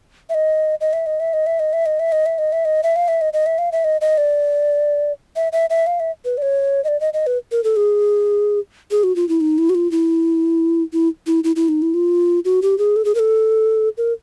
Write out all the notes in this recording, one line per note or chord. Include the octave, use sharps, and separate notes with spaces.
E5
D#5
D#5
E5
D#5
E5
D#5
E5
D#5
E5
D#5
E5
D#5
E5
D#5
E5
D#5
E5
F5
E5
D#5
D#5
E5
F5
E5
D#5
D#5
D5
E5
E5
E5
F5
E5
B4
D5
C#5
D#5
D5
D#5
D#5
B4
A#4
A4
G#4
G#4
F#4
F4
E4
D#4
E4
F#4
F4
E4
E4
E4
E4
E4
D#4
E4
F4
F#4
G4
G#4
A4
G#4
A#4
A4
A#4